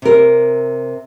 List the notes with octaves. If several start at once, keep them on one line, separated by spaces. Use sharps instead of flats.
C3 A#4